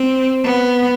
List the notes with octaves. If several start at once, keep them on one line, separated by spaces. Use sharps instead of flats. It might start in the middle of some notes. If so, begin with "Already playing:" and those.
Already playing: C4
B3